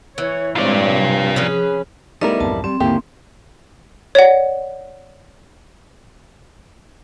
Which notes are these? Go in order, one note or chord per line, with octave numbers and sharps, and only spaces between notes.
E3 C#5
G2 G#3 C4 F4 C#5 D5
C3 F#3
F3 C#4 G#4 B4
G3 A3 B3 D#4 E4 A#4 D#5
B1 F2 G#2 A5
G3 C4
D#2 G#2 D3 A#3 E4 G4
C#5 D5 F#5